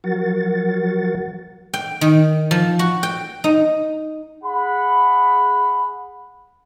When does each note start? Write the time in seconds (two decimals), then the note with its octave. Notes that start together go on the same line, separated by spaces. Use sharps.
0.04 F3 F#3 F#4 A#4 F#5 A6
1.74 G5
2.01 D#3
2.51 F3
2.79 F#4
3.03 G5
3.44 D#4
4.44 G#4 F#5 B5